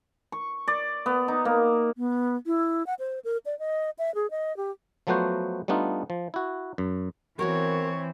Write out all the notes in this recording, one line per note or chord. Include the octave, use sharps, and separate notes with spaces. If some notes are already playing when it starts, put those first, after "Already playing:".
C#6
D5
B3
D#4
A#3
B3
E4
F#5
C5
A#4
D5
D#5
E5
G#4
D#5
G4
F3 F#3 A3 B3 F#4 C5
G3 A3 B3 D4 D#4 F4
F3
E4 F#4
F#2
E3 B3 C4 F#4 A#4 C#5